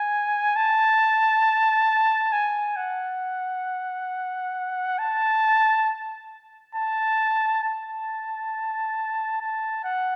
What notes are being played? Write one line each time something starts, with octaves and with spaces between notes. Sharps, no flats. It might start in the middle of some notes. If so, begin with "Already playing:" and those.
Already playing: G#5
A5
G#5
F#5
A5
A5
A5
A5
F#5